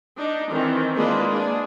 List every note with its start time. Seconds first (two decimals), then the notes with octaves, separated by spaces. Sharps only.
0.17 D4 D#4
0.50 D#3 E3 C4
0.95 G#3 A#3 D4 F4 B4
1.31 D4 G#4